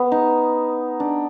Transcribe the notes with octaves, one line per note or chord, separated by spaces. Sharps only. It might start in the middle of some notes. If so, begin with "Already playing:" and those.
Already playing: B3
D#4
D4